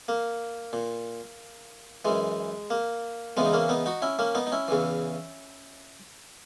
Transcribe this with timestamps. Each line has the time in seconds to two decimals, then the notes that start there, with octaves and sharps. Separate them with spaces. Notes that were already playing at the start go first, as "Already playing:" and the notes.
0.08 A#3
0.73 A#2
2.05 F#2 E3 G#3
2.70 A#3
3.37 E2 C#3 E3 G#3 B3
3.46 D#4
3.53 A#3 C#4
3.69 B3 D#4
3.86 D#4 F#4
4.02 C#4 E4
4.19 A#3 C#4
4.35 B3 D#4
4.47 D#4
4.52 C#4 E4
4.68 E2 C#3 E3